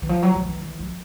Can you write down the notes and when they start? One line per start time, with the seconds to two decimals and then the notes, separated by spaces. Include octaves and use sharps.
0.02 E3
0.09 F3
0.22 F#3
0.36 F3
0.48 E3
0.62 E3
0.79 F3